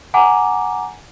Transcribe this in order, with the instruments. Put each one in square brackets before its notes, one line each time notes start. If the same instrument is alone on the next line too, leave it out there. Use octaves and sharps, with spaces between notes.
[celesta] F#5 G#5 A#5 D6